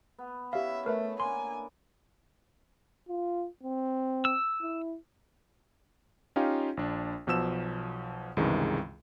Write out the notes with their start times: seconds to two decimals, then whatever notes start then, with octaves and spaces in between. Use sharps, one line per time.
0.19 B3
0.53 C#4 E4 G4 E5 F5
0.86 A3 A#4 B4 E5
1.20 D3 A#3 D5 G#5 C6
3.09 F4
3.63 C4
4.25 E6
4.62 E4
6.36 C#4 D#4 F4 G4 F5 G5
6.77 A#1 D4
7.27 B1 B2 F3 E6 E7
8.37 C#2 G2 C3 D#3 E3 G#3